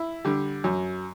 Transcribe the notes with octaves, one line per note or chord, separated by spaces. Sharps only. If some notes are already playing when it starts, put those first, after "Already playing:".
Already playing: E4
D3 G3
F#2